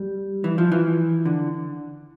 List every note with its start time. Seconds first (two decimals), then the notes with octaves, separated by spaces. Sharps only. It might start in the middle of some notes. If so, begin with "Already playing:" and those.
Already playing: G3
0.44 E3
0.58 F3
0.72 E3
1.25 D3